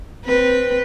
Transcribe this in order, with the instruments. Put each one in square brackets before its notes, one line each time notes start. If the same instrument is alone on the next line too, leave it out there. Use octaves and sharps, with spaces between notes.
[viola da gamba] C4 B4